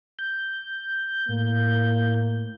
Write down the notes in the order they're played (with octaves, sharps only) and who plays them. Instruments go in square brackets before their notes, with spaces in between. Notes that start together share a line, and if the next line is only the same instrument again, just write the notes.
[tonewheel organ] G6
[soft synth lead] A2 [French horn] A#3